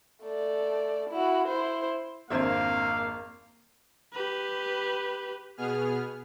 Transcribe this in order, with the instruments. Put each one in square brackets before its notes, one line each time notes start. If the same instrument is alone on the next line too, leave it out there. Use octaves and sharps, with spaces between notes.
[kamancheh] A3 D5
E4 F#4
E4 C5
[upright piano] G#1 C5 G#6 [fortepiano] F2 D4 E5 [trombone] A#3 [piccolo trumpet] F5
[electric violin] G4 B4
[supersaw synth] B2 B3 G#4 F6